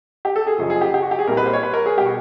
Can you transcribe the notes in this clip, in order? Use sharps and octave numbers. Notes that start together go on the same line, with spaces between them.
G4
A4
G#4
F#1 F#2 C#3 F3 G#4
G#4
G4
G4
F#4
G4
G#4
C2 A#2 G3 A#4
B4
C5
C#5
B4
A#4
G#4
B2 G3 G4
F#4